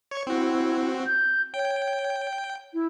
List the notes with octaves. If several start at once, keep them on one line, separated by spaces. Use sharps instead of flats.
C#5 C#6
C4 E4 F#4
G6
C#5 G5
E4